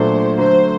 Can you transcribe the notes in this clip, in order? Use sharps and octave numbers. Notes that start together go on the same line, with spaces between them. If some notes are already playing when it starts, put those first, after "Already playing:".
Already playing: A#2 F#3 A3 D4 C5
D3 F#3 A3 C5